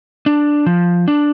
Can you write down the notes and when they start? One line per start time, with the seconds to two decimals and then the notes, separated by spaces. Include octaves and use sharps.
0.26 D4
0.66 F3
1.08 D4